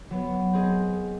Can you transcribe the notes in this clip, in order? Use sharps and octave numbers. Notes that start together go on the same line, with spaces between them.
F#3 B3
C4 G#4 D#5